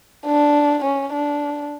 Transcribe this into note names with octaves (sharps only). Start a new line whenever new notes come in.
D4
C#4
D4